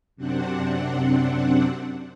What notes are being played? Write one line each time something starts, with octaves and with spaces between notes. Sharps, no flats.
F#2 C3 C4 D4 F#5